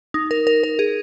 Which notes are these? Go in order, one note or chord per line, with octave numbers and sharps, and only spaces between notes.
D#4
A#4
A#4
A#4
G#4